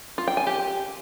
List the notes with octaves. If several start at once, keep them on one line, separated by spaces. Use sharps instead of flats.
F4
G5
G#5
G4